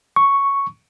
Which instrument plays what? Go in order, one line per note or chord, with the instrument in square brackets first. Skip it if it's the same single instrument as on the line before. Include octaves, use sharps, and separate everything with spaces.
[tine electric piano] C#6